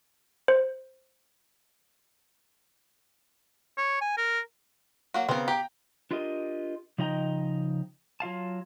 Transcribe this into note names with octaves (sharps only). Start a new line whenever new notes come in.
C5
C#5
G#5
A#4
F#3 A#3 F#4
C#3 B3 C4 A#4
G4 G5 A#5
D4 F4 G4 A#4 D#5
C#3 F3 D#4 D#5 G5 A#5
F#3 F4 F5 A5